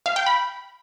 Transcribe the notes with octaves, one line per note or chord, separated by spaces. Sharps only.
F5
G5
B5